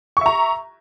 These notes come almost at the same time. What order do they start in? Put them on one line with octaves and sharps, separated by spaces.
C#6 E5 A#5